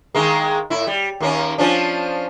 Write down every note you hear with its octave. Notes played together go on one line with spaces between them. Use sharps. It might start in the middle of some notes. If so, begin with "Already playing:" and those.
D#3 G#3 A#3
A2 E4
G3
D#2 A#3 C#4
F3 C#4 D4